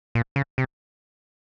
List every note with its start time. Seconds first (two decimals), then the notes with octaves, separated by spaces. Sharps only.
0.15 A#2
0.36 C#3
0.58 C3